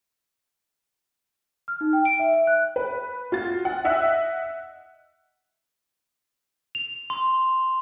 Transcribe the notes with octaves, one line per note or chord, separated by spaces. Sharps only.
F6
D#4
G5
D7
E5
E5
F#6
B4
F4 F#4 A6
F#5
D#5 E5 F#5 E6 F#6
F7
C6